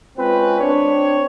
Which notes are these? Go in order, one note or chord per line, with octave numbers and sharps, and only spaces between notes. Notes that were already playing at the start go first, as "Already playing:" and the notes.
G#3 C4 C#4 F4 B4
C4 D4 C#5